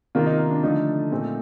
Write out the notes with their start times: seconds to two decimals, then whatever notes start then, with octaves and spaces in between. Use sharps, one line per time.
0.15 C3 D#3 A#3 F4
0.26 D#4
0.39 D#4
0.50 D4
0.63 D3 F3 A3 D4 D#4
1.11 A#2 F3 A3 C4